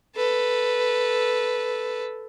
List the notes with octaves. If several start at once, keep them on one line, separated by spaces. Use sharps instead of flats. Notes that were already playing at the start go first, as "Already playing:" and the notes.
A4 B4